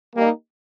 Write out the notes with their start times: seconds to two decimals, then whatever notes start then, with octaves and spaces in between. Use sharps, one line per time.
0.16 G3 A#3 D#4 G4